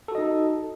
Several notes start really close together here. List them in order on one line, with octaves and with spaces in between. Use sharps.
A4 F#4 D#5 D#4